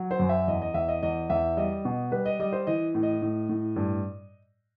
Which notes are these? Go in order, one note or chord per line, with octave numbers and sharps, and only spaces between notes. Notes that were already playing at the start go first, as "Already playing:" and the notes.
Already playing: F#3
C5
F#2
E5
E2 D#5
D#5
E2 E5
D#5
E2 D#5
E2 E5
G3 D#5
B2
G3 B4
D#5
G3 D#5
C5
E3 D#5
A2
D#5
A2
A2
G2